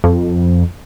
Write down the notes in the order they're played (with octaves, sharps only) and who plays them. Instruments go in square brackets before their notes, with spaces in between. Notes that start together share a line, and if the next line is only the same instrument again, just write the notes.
[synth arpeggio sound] F2